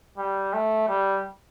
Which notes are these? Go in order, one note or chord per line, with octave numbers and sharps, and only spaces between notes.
G3
A3
G3